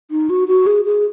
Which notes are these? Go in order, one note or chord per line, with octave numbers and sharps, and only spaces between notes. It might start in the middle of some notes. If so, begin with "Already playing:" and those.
D#4
F#4
F#4
G#4
G#4